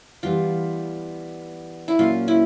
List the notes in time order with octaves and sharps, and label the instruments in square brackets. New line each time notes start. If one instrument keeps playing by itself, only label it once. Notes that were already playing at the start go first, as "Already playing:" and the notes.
[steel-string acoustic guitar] E3 G3 B3 [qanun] F4
[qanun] E4
[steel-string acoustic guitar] A#2 F#3 A#3 C#4 [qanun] F4
[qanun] E4